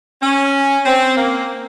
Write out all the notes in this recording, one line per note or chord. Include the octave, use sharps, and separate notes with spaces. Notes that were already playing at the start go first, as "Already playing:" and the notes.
C#4
C4
A#3